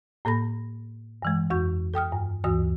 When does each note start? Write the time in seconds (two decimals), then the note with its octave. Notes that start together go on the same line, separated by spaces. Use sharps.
0.25 A2 A#3 A4 B5 A#6
1.22 G2 E3 G#3
1.50 F2 F#4 C#6 G6
1.94 A4 G5 D#6 F6
2.12 G2
2.44 D2 G2 E3 F#4 D#6